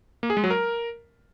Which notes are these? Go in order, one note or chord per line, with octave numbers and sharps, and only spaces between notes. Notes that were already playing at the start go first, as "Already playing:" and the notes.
A#3
G#4
G#3
F#3
A#4